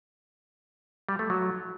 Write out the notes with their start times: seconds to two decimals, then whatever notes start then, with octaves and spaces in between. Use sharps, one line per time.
1.09 G3
1.19 A3
1.30 F#3